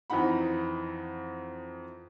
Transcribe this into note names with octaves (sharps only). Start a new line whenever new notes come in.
F2 E3 D#4 F#5 B5